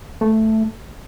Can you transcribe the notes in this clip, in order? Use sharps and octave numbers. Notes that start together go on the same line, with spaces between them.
A3